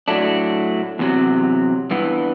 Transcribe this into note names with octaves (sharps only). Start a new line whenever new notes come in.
A2 F#3 A3 D4
E2 C3 F#3
G2 E3 B3